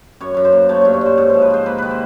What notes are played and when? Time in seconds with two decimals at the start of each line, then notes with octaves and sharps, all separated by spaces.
0.20 F#2 C#5
0.34 F#2 C#5
0.45 C5
0.52 A#3
0.69 A3 C#5
0.81 G2 C#5
0.93 C#5
1.01 G2 C5
1.18 G#2 C#5
1.29 F3 C5
1.42 B4
1.50 G#2 C5
1.66 A#3 B4
1.78 D#3 B4
1.91 C5